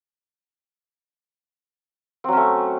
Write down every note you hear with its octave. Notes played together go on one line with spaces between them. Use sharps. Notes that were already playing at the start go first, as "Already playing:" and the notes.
F#3 A3 C4 C#4